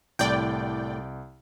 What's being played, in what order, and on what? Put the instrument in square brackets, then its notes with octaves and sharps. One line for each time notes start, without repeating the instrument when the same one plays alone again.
[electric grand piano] C2 [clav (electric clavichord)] A2 [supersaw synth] D5 G5